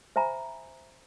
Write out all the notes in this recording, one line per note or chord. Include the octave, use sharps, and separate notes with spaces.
C5 E5 G#5 A#5 B5